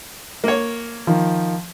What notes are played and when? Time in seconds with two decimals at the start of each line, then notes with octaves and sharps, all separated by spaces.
0.44 A#3 C#5
1.07 D#3 F3